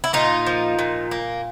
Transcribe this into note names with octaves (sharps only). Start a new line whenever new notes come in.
E4
A#2 D#4 F4
F3
A#2
A#3